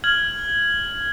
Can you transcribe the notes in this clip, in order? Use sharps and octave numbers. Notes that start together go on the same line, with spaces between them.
F6 G#6 F#7